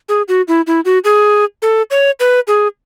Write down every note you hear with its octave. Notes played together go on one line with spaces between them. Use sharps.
G#4
F#4
E4
E4
F#4
G#4
A4
C#5
B4
G#4